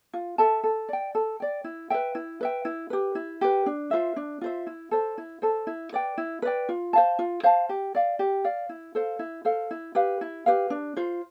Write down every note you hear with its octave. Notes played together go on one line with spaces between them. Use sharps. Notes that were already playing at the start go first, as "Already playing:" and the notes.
F4
A4 E5 A5
A4
D5 G5
A4
D5 G5
E4
B4 E5 G5
E4
B4 E5 G5
E4
G4 B4
E4
G4 B4
D4
F4 C5 E5
D4
F4 C5 E5
E4
A4 C5
E4
A4 C5
E4
B4 D5 G5
E4
B4 D5 G5
F4
C5 F5 A5
F4
C5 F5 A5
G4
D5 F5
G4
D5 F5
E4
A4 C5 F5
E4
A4 C5 F5
E4
G4 B4 F5
E4
G4 B4 F5
D4
F4 C5